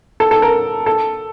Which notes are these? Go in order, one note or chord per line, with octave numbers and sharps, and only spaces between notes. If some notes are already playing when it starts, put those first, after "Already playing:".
A4
A4
A#4
A4